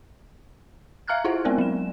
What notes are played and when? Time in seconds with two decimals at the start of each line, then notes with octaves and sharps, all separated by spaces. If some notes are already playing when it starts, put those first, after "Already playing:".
1.08 E5 F5 A#5 F6 F#6 G#6
1.25 E4 F4 C5 F#5
1.45 G#3 B3 C4 A#4 D5
1.58 F#3 G#3 E7